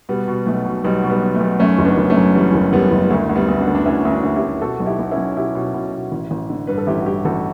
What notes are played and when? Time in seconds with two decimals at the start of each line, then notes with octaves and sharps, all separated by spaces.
0.09 B2 G3 B3
0.28 B2
0.46 B1 A3
0.65 B2
0.84 B1 G3 B3
1.03 B2
1.10 G3 B3
1.22 B1
1.35 A3
1.41 B1
1.60 F#2 A3 C#4
1.79 F#1
1.85 B3 D4
1.97 F#1
2.10 A3 C#4
2.17 F#2
2.35 E3 G3 B3
2.54 F#1
2.73 F#1 G3 B3
2.91 F#1
3.03 G3
3.10 D2 A3
3.29 D2
3.36 G3 B3
3.48 D2
3.61 D4 F#4
3.67 D2
3.75 D4
3.86 D2 C#4 E4
4.05 D2
4.11 D4 F#4
4.23 D2
4.36 E4 G4
4.42 D2
4.61 B2 F#4 A4
4.80 B1
4.86 E4 G4
4.99 B1 F#4
5.11 C#4 E4
5.18 B1
5.37 B2 E4 G4
5.55 B2
5.74 B2
5.93 B2
6.12 A1
6.31 A1
6.50 D3
6.67 G2 B4
6.78 A4
6.87 A1 E4 G4
7.00 F#4
7.06 G2 E4 G4
7.25 A1 F#4 A4